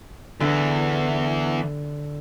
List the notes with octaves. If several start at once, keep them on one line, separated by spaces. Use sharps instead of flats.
E2 D3 E3